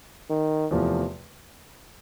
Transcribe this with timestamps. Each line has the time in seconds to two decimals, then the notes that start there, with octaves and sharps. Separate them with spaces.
0.30 D#3
0.71 E2 C3 F3 A3